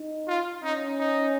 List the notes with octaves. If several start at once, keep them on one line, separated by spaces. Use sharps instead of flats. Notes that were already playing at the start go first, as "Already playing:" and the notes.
Already playing: D#4
F4
C#4 D#4
D#4